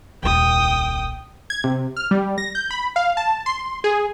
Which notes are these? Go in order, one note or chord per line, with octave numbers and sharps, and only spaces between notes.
D#1 C2 G5 D#6
G#6
C3
F6
G3
A#6
G6
B5
F5
A5
C6
G#4